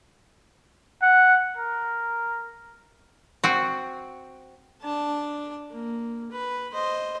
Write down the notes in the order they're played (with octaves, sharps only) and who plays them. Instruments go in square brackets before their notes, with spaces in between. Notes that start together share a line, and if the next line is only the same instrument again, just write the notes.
[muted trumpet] F#5
A#4
[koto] C4 F#4
[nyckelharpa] D4 A5
A#3
B4
C5 D#5